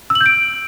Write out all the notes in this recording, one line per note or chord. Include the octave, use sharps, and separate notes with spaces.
E6
F#7
G6
D7